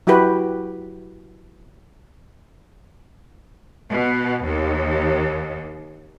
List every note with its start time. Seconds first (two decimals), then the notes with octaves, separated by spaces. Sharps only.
0.07 F#3 E4 F#4 G4 B4
3.90 B2
4.45 D#2